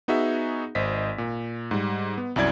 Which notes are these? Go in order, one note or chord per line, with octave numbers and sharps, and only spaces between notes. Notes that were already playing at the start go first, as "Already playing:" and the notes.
B3 D#4 F#4 G#4 E5
G#1 C5 D#5 B6
A#2
G#2 G3
B3
C2 F#2 E4 D5 G#6